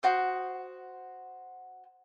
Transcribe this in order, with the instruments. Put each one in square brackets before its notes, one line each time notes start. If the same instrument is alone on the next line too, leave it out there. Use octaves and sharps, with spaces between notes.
[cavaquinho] F#4 C5 D#6